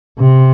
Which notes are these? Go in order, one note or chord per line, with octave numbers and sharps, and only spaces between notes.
C3